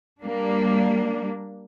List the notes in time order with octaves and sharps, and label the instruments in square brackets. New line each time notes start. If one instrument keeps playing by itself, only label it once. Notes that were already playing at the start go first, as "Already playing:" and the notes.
[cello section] G3 A#3 D4